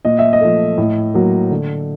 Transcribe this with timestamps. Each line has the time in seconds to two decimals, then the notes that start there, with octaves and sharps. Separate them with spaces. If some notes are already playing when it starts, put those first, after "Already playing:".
0.05 A#2 D#5
0.19 E5
0.33 D#5
0.41 F3 A3
0.78 A2
1.14 F#3 A#3
1.51 D3